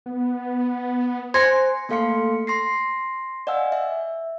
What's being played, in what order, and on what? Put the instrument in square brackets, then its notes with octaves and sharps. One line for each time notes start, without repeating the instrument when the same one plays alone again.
[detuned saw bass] B3
[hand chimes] C5 G#5 [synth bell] C6 [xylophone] G#6 A#6 C#7
[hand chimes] A3 A#3 A4 F5 C6 C#7
C6 A#6 C7
D5 D#5 F5 F#5 G#5 E6
E5